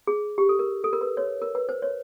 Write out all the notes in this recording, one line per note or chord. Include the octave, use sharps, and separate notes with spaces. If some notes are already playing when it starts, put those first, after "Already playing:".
G#4
G4
A4
A#4
A4
A#4
B4
C#5
A#4
B4
C5
C#5